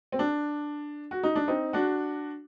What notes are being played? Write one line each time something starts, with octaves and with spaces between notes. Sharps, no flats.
C4
D4
F#4
D#4
D4
C4 D#4
D4 F#4